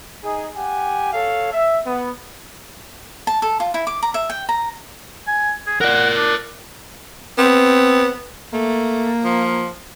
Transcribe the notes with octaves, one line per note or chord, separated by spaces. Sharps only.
D#4 G#4
G4 F#5 G#5
A4 C#5 F5
E5
B3
A5
A4
F4
E4
D6
A#5
E5
G5
A#5
G#5
G#4
A#4 D5 F#5
D4
B3 C4
A3 A#3
F3